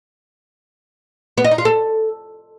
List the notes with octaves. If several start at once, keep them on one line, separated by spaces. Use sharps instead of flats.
B3
D#5
D#4
F4
A4